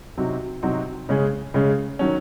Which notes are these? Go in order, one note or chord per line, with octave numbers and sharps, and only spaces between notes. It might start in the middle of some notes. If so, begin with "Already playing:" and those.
C3 F#3 C4 D#4 F#4
C3 F#3 C4 D#4 F#4
C#3 G#3 C#4 G#4
C#3 G#3 C#4 G#4
D#3 F#3 C#4